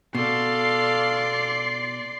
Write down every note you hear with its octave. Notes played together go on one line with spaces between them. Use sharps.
B2 A4 D5 F5 C6